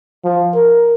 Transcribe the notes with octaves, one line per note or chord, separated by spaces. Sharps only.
F3
A#4